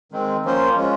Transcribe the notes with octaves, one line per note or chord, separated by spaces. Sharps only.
D#3 G#3 C4
F3 A#3 C#4 F4 C5
G#3 C#4 F4